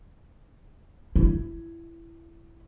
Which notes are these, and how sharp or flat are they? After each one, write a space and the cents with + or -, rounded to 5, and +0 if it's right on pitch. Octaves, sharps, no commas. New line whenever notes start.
E4 +15